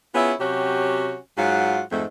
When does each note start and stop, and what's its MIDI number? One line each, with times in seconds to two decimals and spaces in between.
0.14 0.33 59
0.14 0.33 61
0.14 0.33 64
0.14 0.33 65
0.14 0.33 68
0.40 1.17 48
0.40 1.17 54
0.40 1.17 61
0.40 1.17 66
0.40 1.17 67
1.37 1.81 44
1.37 1.81 54
1.37 1.81 65
1.37 1.81 66
1.37 1.81 78
1.92 2.04 41
1.92 2.04 44
1.92 2.04 57